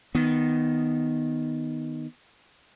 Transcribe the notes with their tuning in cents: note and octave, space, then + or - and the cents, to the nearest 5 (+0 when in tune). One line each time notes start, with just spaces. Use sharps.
D#3 +0 B3 +0